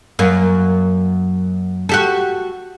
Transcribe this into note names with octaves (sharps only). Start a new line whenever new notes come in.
F#2 A#3
F#4 G4 A4